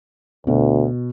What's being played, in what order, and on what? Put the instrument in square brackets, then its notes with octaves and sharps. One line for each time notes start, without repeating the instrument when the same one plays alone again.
[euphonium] D2 [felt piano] B2